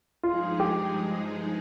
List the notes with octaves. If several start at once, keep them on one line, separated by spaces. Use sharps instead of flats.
G2 F3 G#3 D#4 F4 G#4
G4